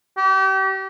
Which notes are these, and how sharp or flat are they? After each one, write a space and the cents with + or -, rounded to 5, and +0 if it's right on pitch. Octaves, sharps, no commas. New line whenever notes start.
G4 -35